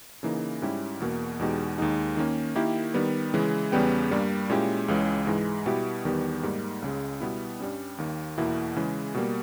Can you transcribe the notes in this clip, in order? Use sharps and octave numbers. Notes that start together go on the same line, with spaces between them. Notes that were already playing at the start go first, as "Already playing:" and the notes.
C#3 E3 A#3 D#4
G#2 G3 C#4 E4 G4
E2 B2 A#3
E2 B2 G#3 D#4 G4
D#2 D#3 G#3 D#4
D#3 A#3 C#4
D#3 A#3 E4 G4
D#3 G3 B3
C#3 E3 G#3
E2 C#3 G3 B3 G4
G2 G3 A#3
A#2 G#3 C#4 E4 G4
C#2 C#3 E3 G#3 C#4
G#2 E3 G#3
B2 G3 B3 E4 G4
E2 D#3 G3 B3 G4
G#2 G3 A#3 D#4
C#2 C#3 G#3
B2 G3 B3 E4
G2 G3 C#4
D#2 D#3 A#3
E2 B2 A#3 E4
C#3 E3 G#3
B2 G3 A#3